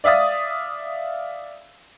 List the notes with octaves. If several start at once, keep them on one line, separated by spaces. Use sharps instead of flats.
D5 E5 F5 D#6 A6